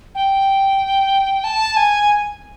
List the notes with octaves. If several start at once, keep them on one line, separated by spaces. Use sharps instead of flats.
G5
A5
G#5